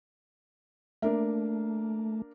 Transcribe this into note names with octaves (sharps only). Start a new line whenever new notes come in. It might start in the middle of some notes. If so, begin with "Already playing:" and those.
A3 A#3 D4 A#4